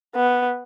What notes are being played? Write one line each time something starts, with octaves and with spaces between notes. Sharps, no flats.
B3